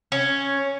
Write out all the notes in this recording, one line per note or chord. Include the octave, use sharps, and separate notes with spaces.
C#4